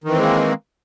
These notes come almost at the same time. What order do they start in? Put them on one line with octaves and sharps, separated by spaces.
D#3 E3 C4 G#3 A#3